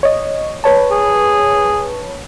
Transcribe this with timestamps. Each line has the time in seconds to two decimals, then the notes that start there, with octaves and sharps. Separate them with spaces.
0.03 C#5 D#5
0.64 B4 C#5 A5
0.91 G#4